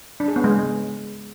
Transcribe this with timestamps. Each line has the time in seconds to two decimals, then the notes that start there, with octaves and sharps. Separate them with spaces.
0.20 D4
0.28 G#4
0.36 B3
0.44 G#3